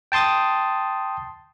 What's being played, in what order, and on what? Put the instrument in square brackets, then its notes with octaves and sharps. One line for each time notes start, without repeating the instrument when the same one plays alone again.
[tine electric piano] G5 A5 C6 D#6 A6